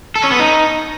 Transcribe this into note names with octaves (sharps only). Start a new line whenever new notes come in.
A4
C#4
B3
D#4